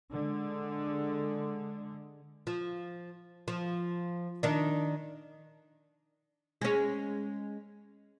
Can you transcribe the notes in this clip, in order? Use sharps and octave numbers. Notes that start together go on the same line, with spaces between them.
D3 G#3
F3
F3
D#3 D4
G#3 C#4